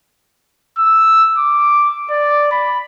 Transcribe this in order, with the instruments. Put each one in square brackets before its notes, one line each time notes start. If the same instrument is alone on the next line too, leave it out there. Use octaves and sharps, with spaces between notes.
[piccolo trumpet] E6
D6
D5
B5